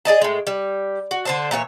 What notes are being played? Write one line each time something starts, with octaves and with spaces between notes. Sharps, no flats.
G#4 D5 D#5 A5
A2 G#3
G3
F#4
D3 C5 A5
A#2 E3 F#4 C#5